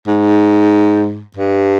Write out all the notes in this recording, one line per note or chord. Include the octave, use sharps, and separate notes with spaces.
G#2
G2